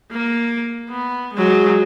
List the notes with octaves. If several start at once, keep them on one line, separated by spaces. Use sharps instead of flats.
A#3
B3
F#3 G#3